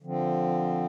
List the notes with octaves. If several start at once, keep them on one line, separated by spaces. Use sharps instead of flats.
D3 F3 C4